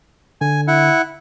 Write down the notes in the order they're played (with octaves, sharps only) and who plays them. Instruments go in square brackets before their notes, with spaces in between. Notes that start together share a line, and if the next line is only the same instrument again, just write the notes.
[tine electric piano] D3 [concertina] G#5
[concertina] E4 F#5